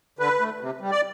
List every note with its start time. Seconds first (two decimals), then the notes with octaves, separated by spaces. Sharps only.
0.19 D3 B4
0.40 A3
0.61 C3
0.81 G3
0.91 D5